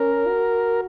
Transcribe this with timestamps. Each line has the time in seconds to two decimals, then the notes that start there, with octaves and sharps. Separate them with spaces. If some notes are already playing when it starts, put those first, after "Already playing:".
Already playing: C#4 A#4
0.27 F#4